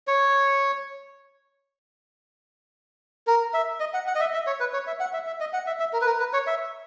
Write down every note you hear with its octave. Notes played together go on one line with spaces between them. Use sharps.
C#5
A#4
E5
D#5
F#5
F#5
D#5
E5
E5
C#5
B4
C#5
E5
F#5
E5
E5
D#5
F#5
E5
E5
A#4
B4
A#4
B4
C#5
E5